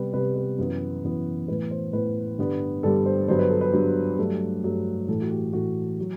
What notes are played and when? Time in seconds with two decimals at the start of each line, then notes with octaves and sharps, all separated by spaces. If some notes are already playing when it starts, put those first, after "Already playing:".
Already playing: C3 G3 B3 B4
0.13 C3 G3 B3 B4
0.36 B4
0.58 F#2 E3 B3
1.03 F#2 E3 B3
1.48 A2 E3 B3 B4
1.71 C5
1.93 A2 E3 B3 B4
2.38 G2 D3 G3 B3
2.83 G2 D3 G3 B3 A4
3.06 C5
3.28 G2 D3 F#3 B3 C5
3.39 B4
3.50 A4
3.61 B4
3.73 G2 D3 F#3 B3
4.18 G2 F#3 A3
4.63 G2 F#3 A3
5.08 A2 E3 A3 A4
5.22 F#4
5.31 G4
5.53 A2 E3 A3 F#4
6.00 F#3